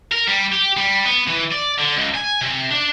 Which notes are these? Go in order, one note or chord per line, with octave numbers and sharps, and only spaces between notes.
A#4
G3
G4
G3
B3
E3
D5
D3
C#2
G#5
C3
D4